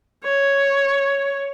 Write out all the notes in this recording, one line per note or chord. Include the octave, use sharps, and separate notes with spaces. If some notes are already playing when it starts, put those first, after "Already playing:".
C#5